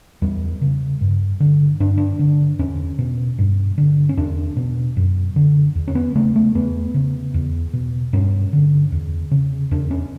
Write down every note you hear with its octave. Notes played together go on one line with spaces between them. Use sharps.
E2 G3
C#3
G2
D3
G2 D4
D4
D3
E2 C#4
B2
G2
D3
C#4
E2 D4
B2
F#2
D3
E2
C#4
B3
C#3 A3
A3
E2 B3
C#3
E2
B2
G2 C#4
D3
E2
C#3
E2 D4
C#4